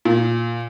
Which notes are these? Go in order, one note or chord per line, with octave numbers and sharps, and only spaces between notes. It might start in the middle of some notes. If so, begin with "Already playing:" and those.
A#2